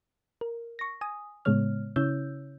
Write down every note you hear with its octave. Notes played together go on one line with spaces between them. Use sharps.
A#4
C#6 A#6
G#5 D#6
A2 C#3 G#3 B3 C#5 F6
C#3 C#4 E4 C#5 E6 G6